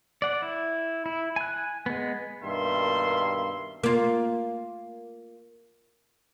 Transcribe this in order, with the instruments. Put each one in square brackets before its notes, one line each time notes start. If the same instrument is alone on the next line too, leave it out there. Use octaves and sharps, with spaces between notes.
[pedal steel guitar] D5 F#5
E4
E4
G#5 F#6
G#3 B3
[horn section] G2 B2 D#3 A#3 E5 C6
[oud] A#3 F4